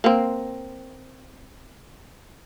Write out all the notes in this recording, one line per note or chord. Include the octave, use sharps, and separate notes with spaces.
A#3 C4